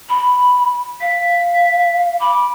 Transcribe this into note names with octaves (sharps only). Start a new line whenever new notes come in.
B5
F5 B6
B5 D6